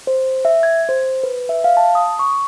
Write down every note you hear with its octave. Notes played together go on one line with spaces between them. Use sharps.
C5
E5
G#6
C5
B4
E5
F5
A5
D#6
C#6